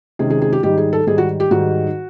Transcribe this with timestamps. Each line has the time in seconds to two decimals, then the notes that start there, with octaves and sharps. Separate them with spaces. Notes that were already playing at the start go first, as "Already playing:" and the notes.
0.19 C3 D#3 G#3 C#4 G#4
0.31 G#4
0.42 G#4
0.52 G4
0.63 G#2 D#3 G3 G4
0.78 G#4
0.93 A4
1.07 G#2 D#3 G3 G#4
1.18 F#4
1.40 G4
1.51 G#2 D#3 G3 F#4